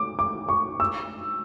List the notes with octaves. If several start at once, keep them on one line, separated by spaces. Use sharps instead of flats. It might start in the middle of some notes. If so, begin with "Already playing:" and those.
Already playing: D6
D6
C#6
E6